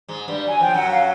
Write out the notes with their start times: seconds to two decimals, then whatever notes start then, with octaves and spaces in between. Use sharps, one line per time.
0.08 G#2 G#3
0.28 G2 G3
0.47 F#3 G#5
0.61 F3 G5
0.74 F#2 F#3 F#5
0.90 F5